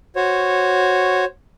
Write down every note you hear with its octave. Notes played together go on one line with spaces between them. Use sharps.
F#4 C5 C#5